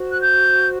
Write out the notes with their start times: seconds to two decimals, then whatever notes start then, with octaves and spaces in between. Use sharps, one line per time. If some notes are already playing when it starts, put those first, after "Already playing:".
Already playing: F#4 C5
0.11 F#6
0.21 G6